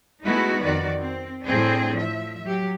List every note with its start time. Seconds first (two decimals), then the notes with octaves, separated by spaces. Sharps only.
0.24 G#3 A3 B3 D#4 E4 F#4
0.62 F2 D#3 F#4 D5
0.98 C4
1.44 A2 C4 D4 G#4
1.98 F3 E5
2.45 F#3 G4